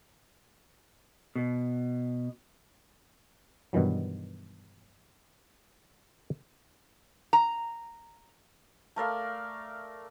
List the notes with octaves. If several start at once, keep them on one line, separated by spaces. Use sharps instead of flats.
B2
G2 B2 D#3 E3 F#3
A#5
A3 A#4 D5 F5